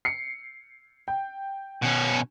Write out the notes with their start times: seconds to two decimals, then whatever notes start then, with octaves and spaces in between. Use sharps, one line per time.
0.05 C7 C#7
1.08 G5
1.82 B2 C#4